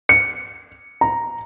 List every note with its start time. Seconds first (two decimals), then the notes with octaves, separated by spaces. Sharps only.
0.09 C#7
1.01 A#5